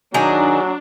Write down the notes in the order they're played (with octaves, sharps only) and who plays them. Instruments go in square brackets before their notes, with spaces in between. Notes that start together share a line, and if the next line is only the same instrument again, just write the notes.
[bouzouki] D#3 G#4 A#5 [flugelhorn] F#3 [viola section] D4